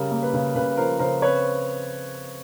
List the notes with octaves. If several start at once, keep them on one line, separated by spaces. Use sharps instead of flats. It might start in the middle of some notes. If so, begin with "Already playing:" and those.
Already playing: C#3 G3 A#4
A#3
B4
C#3
C#3 B4
F3 A#4 C5
C#3 A#4 C5
C4 B4 C#5